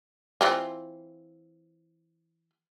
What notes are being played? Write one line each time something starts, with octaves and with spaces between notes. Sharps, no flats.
E3 C4 F4